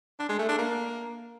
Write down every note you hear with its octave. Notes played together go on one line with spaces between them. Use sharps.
D4
G#3
A3
D4
A#3